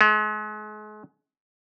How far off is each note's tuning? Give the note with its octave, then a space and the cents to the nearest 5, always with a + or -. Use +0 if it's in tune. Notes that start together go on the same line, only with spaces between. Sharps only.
G#3 +40